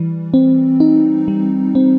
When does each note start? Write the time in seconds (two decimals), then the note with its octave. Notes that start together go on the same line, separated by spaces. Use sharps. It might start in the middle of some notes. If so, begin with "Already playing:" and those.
Already playing: E3 G3
0.34 C4
0.80 D#4
1.28 G3
1.75 C4